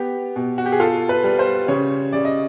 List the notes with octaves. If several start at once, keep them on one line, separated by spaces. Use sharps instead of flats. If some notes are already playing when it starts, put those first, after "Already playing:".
Already playing: B3 G4
B2
F#4
G4
G#4
F4 A4
B4
G3
C5
C#3 C#5
C#3 D5
D#5